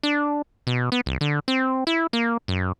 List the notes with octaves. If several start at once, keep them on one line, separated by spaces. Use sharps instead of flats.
D4
B2
B3
C2
D3
C4
E4
A#3
F#2